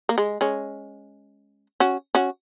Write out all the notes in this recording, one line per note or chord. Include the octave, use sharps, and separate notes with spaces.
A#3
G#3
G#3 C#4
C#4 F#4
C#4 F#4